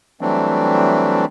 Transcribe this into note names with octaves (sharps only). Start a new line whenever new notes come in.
E3 F#3 G3 A3 C4 D4